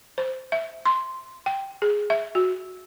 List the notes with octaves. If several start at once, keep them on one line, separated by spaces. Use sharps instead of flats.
C5
E5
C6
G5
G#4
E5
F#4